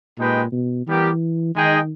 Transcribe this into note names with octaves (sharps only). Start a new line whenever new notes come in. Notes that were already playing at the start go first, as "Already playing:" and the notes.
A#2 G#3 D#4 G4 B4 G5
B2
E3 G3 B3 G4 A#4
D#3 G#3 D#4 G#4 D#5 G5